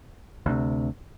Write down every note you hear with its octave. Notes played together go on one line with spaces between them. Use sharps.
D2 C3